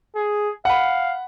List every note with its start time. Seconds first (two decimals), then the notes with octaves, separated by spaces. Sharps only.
0.16 G#4
0.65 F5 F#5 B5